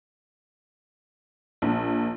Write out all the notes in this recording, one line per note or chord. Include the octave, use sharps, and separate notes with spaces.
A#1